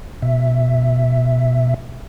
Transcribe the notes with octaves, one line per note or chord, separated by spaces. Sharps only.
B2 E5